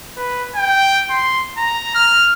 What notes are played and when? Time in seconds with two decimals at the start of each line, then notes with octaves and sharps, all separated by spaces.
0.17 B4
0.56 G5
1.10 C6
1.58 A#5
1.95 F6